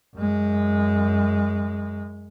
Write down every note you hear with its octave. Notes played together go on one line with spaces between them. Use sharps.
F#2 G#3